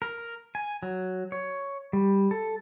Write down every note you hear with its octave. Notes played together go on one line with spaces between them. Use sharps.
A#4
G#5
F#3
C#5
G3
A4